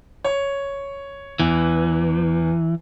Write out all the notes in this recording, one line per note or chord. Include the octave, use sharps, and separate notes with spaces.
C#5
E2 E3